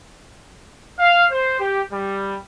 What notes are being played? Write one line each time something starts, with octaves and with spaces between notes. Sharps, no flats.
F5
C5
G4
G3